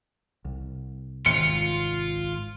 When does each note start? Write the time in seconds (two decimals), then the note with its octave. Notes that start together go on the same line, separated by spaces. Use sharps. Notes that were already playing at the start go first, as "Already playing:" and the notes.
0.45 C2
1.26 G#1 F4 C#7